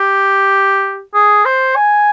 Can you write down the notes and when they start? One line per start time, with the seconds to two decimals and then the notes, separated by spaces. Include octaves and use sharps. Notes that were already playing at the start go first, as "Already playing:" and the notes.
Already playing: G4
1.14 G#4
1.45 C5
1.76 G#5